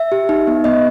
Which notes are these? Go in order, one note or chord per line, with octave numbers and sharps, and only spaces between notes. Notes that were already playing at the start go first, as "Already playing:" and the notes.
Already playing: E5
G4
D#4
B3
B3 D#5